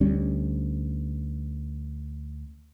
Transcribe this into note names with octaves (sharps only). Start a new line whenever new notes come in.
D2 G3 C#4